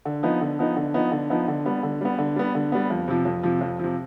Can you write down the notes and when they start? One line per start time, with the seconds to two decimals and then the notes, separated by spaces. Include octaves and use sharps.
0.05 D3
0.23 F3 B3 D#4
0.41 D3
0.59 F3 B3 D#4
0.77 D3
0.94 F3 B3 D#4
1.12 D3
1.30 F3 B3 D#4
1.48 D3
1.66 G3 B3
1.83 D3
2.01 G3 B3
2.19 D3
2.36 G3 B3
2.55 D3
2.72 G3 B3
2.90 F2
3.08 C3 F3
3.25 F2
3.43 C3 F3
3.61 F2
3.79 C3 F3